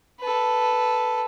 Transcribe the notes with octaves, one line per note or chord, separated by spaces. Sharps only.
A4 B4